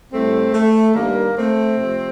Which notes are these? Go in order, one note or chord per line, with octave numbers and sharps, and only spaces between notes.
A2 G3 A3 C4
A3
G2 D#3 G3 A#3
A3 C4
C3 F3 A3